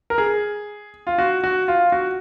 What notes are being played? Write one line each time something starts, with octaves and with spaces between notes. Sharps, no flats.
A#4
G#4
F4
F#4
F#4
F4
F#4